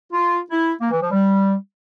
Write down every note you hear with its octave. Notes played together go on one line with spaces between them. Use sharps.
F4
E4
A#3
E3
F3
G3